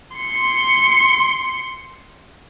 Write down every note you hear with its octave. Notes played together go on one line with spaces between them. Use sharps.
C6 C#7